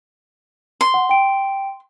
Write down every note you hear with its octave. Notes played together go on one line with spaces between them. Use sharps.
C6
F#5
G5 D7